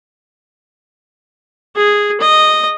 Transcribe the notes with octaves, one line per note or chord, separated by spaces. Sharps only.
G#4
D#5